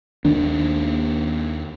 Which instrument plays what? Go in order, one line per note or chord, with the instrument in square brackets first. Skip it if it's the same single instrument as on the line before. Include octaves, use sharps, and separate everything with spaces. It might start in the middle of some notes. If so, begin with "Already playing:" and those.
[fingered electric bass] D#2 D#3 D4